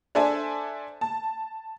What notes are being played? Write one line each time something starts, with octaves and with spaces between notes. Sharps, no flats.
D4 A4 C5 D5 E5 G#5
A5